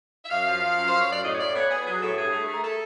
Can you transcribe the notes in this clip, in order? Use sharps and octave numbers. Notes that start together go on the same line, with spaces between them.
E5
F#2 F5
F3
F3
F#2
C5
F#2
C#5
F#2 D5
A2 D#5
C#5
A2 D5
B3 C#5
B3 G#4
F#3 G#4
A2 A4
G2 G#4
A3
A3
A#4
A3 A4